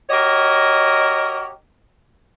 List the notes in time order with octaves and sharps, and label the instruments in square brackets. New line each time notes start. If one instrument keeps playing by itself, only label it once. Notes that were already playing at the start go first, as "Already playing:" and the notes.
[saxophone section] F#4 G4 A#4 C#5 D#5